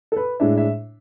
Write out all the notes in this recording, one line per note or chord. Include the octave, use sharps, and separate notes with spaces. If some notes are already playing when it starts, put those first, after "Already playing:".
A4
B4
A2 G#3 D4 E5
E5